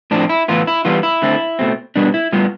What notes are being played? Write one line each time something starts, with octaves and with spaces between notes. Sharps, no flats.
A2 F3 C4 D4
E4
A2 E3 B3 F4
E4
E3 G3 B3 F4
E4
D3 A3 C4
B2 A3 C4
B2 G3 B3 D4
E4
A2 G3 B3 F4